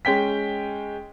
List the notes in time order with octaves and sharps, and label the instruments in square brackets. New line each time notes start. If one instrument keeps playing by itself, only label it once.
[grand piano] G#3 C#4 G5 B6